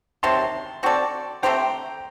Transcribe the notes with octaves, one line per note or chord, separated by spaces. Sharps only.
C3 D#3 F#3 A5 C6
C4 F#4 A4 D5
A3 C4 G4 C5 G5 A#5